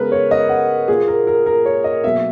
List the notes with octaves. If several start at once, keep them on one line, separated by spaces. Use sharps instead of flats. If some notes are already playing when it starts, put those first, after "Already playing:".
Already playing: C#3 G#3 B3 A#4 B4
C#5
D#5
F#5
A#2 A#3 G#4
A#4
A#4
A#4
C#5
D#5
B2 F#3 A#3 E5